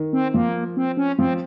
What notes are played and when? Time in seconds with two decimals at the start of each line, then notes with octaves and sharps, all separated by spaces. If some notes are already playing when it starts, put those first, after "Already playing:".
Already playing: D#3
0.13 C4
0.34 F3 A#3
0.77 C4
0.97 C#4
1.19 F3 C4